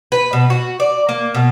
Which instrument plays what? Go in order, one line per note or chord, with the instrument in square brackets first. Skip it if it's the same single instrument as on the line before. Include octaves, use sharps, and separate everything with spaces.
[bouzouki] B4
B2
F#4
D5
A#3
B2